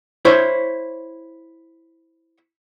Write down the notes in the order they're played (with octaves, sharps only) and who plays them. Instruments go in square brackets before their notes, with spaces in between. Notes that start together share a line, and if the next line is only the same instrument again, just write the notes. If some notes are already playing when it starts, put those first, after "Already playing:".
[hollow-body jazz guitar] E4 C5 C#5